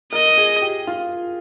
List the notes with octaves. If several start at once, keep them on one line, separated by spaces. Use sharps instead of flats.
A#4 D#5
G#4
G4
F4